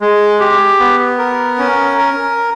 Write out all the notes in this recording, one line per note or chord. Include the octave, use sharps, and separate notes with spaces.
G#3
G4
B3
A#4
C#4
A#4